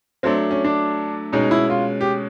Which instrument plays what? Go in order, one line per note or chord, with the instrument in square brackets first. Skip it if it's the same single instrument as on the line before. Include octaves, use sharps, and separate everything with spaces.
[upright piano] F#3 A3 D4 [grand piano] C4
[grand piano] C#4
D4
[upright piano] B2 G#3 C#4 [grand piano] D#4
[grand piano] E4
F4
G4